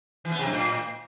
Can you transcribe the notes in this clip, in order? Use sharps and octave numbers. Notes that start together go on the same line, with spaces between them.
E3
B3
C3
F#2
A2